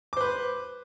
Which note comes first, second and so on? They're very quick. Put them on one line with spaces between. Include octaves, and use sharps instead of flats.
D6 C5 B4